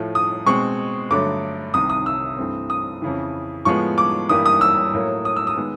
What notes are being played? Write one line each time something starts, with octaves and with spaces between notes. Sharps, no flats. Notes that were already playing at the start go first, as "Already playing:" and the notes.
Already playing: A2 F3 A3
D#6
B2 G#3 C4 C#6
G2 D3 F#3 A3 D6
C2 C3 D#3 D#6
D#6
E6
G2 E3 A3 C4
D#6
F2 C#3 E3
A2 F3 G#3 B3 C#6
D6
G2 E3 G3 A#3 D#6
D#6
E6
A2 F#3 A#3
D#6
E6
D#6
D#3 G#3 B3